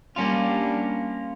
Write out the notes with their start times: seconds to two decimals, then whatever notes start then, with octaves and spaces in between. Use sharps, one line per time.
0.16 G3 A#3 C#4 D4 F4